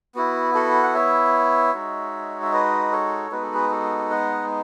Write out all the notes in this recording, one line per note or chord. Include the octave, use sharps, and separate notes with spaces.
B3 E4 F#4
F#4 A4
F#5
C#5 E5
G#3 D#4 F#4
E5
B4 D#5
A4 C#5
G#3 B3 D#4 F#4 B4
A4
G#4 B4
F#4 A4
D#5 F#5